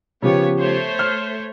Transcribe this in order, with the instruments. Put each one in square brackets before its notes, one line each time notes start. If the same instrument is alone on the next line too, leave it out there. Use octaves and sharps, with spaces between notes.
[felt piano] C#3 F3 G4 [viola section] B3 C#5
[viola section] A3 C5 C#5
[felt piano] F6